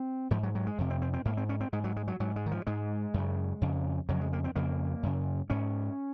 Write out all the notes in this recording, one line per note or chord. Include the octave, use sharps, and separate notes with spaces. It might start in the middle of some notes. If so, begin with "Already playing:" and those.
Already playing: C4
G#2 F3
F#3
F#3
G#3
F2 C3
C4
C4
C4
G#2 A#3
C4
C#4
C4
G#2 G#3
F#3
G#3
F#3
G#2 F#3
G#3
D#3
F3
G#2 G#3
F#2 C#3
F2 C#3
F2 C#3 F#3
G#3
A#3
C4
F2 C#3 A#3
F#2 C#3
G#2 C#4